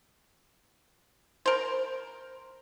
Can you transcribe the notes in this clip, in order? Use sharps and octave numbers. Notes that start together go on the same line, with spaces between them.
A#4 C5